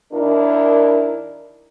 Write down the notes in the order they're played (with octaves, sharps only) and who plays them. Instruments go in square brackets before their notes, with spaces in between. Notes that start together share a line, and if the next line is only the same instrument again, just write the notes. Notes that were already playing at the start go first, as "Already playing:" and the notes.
[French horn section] D#2 D4 E4 A#4